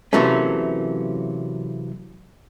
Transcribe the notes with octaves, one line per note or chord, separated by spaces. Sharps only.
C3 E3 F#3 A3 A#3 C#4